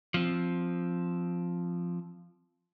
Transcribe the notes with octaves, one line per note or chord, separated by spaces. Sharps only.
F3 C4